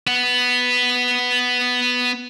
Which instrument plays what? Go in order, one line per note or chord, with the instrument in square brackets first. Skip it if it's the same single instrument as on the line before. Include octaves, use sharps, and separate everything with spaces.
[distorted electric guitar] B3 F#5